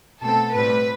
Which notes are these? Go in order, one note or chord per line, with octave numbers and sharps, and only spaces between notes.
B2 A3 C4 A4
A2 G3 C4 B4